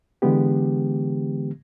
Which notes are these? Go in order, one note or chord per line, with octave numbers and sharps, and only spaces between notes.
D3 E3 G#3 B3 G4